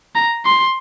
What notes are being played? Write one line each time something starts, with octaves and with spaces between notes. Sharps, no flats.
A#5
C6